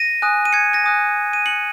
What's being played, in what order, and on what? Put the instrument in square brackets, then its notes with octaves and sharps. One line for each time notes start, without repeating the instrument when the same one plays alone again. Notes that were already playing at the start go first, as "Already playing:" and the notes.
Already playing: [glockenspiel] A#6 D#7
G#5 D#6 F#6
D#7
G#6 C#7
A#6 D#7
G#5 D#6 F#6
D#7
G#5 F#6 C#7 F#7